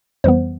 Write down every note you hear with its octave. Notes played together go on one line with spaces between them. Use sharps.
F2 E3 G3 B3 C5